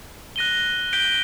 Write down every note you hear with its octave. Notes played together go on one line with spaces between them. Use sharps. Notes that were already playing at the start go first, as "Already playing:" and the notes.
F#6 A#6 D#7 G7
G6 B6 D7 G7